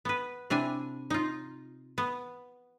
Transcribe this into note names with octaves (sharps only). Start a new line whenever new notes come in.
B3 B4
C3 D4 E4 G#5
D#4 F4
B3